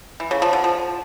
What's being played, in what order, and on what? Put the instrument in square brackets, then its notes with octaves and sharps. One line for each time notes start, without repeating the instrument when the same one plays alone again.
[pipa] E3
C#3
F3
D3
F3